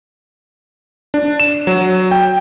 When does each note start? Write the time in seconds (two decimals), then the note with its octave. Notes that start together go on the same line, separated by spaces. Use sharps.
1.14 D4
1.40 E7
1.67 F#3
2.11 G5